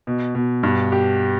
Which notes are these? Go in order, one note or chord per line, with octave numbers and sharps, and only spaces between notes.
B2
B2
G2
G4